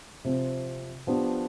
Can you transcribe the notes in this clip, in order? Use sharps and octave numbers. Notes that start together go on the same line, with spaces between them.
C3 F3 C4
F3 B3 D4 G4